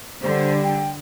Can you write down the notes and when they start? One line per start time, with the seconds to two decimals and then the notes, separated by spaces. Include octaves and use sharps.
0.22 D3 G3 C5
0.63 G5